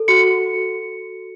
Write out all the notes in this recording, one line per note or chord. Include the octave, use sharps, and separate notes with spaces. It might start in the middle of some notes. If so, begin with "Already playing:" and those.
Already playing: A4
F#4 C#7
F#4
F#4
F#4